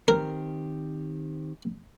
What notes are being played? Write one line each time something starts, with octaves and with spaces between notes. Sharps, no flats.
D#3 C4 G4 A#4